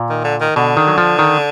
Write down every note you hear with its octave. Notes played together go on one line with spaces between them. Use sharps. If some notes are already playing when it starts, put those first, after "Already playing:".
Already playing: A#2
D#3
D3
D#3
B2 D3
D#3
F#3
F3
D#3